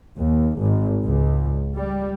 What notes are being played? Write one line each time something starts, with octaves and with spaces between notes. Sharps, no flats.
D#2
G#1
C#2
G3